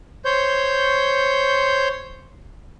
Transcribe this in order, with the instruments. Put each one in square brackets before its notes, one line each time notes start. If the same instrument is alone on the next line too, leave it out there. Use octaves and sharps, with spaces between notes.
[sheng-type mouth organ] C5 C#5 G6